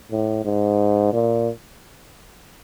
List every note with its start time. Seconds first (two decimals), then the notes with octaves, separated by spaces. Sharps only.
0.12 A2
0.45 G#2
1.13 A#2